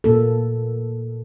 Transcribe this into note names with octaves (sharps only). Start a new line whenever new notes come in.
A#2 A#3 A4